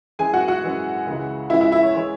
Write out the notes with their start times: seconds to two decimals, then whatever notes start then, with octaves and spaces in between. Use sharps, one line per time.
0.19 F#2 E3 G#3 G#4 G#5
0.34 F#4 F#5
0.48 F#4 F#5
0.63 F#2 E3 G#3
1.06 C#2 C#3 E3 G#3
1.50 C#2 C#3 E3 G#3 E4 E5
1.61 E4 E5
1.72 E4 E5
1.83 C#5
1.94 E3 G#3 C#5